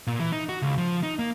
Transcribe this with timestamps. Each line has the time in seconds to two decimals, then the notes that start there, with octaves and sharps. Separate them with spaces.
0.07 A#2
0.20 E3
0.32 D#4
0.49 F#4
0.62 C#2
0.78 F3
1.03 D#4
1.19 A#3